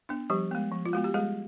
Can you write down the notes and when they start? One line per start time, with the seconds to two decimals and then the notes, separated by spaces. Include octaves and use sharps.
0.09 B3 D4
0.30 F3 G3 G4
0.51 G#3 B3
0.72 F3
0.86 F4
0.93 G#3 B3 F#4
1.04 G4
1.14 G3 G#3 G#4